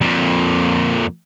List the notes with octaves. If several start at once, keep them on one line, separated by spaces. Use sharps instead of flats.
F2 A#2